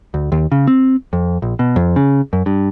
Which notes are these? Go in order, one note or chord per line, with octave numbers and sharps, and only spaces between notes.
D2
D#2
C#3
C4
F2
A#1
B2
F2
C#3
F#2
G2